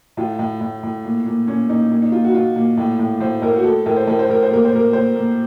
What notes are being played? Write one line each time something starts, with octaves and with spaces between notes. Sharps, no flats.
A2 F4
A2
A2
A2
A#2
A#2
A#2 C#4
A#2 D#4
A#2
D#4
A#2 F4
F#4
A#2 F4
A#2
A2
A2
A2 C5
A2 A#4
F#4
A2 A4
A2 A#4
C5
A2 A#4
C5
A2 A#4
C5
A#2 A#4
C5
A#2 A#4
A#2 C5
A#2